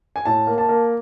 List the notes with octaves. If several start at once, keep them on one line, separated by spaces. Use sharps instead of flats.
G#5
A2 A5
A#3
A5
A#3